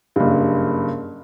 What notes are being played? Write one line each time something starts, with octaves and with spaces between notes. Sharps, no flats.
F#1 G2